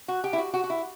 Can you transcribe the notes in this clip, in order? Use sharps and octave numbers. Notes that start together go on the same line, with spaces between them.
F#4
G4
E4
F#4
F#4
F#4
E4